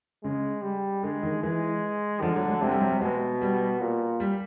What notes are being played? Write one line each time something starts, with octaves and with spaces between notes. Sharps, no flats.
C#3 G#3
G3
D3 G#3
D#3
E3 G#3
D3 F3
F#3
G#3
C3 G#3
G3
F#3
G3
B2 G#3
G3
A#2
G3